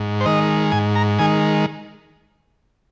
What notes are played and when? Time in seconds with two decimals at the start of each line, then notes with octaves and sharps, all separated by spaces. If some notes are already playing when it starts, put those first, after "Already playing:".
Already playing: G#2
0.20 C5
0.26 D#3 G#3 D#5
0.72 G#2 G#5
0.96 A#5
1.19 D#3 G#3 G#5